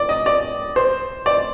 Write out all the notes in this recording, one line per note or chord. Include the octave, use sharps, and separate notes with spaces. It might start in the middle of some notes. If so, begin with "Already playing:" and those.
Already playing: D5
D#5
D5
C5
D5